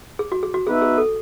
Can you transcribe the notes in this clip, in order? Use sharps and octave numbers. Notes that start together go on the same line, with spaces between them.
G#4
F#4
G#4
F#4
B3 D#4 F#4 G#4 B4 E5
G#4
A4